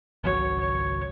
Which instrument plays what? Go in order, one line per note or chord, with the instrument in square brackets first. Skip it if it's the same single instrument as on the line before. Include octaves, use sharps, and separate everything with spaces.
[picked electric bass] G#1 C#2 F#3 [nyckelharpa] C#5
[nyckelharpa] C#5